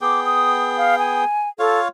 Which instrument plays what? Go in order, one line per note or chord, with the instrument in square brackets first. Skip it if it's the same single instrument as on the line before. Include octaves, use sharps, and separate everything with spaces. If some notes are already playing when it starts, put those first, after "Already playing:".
[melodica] B3 G#4 G5 [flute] D6
[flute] D#6
F5
G#5
[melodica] F4 C#5 F5 [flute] A4